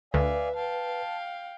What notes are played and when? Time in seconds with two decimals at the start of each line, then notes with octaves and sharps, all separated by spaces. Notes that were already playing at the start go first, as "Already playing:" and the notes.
0.14 D2 B4 D5 E5 F5 G#5
0.55 F5 G5 A5